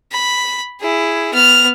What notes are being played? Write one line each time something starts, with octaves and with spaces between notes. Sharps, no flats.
B5
E4 G#4
B3 F6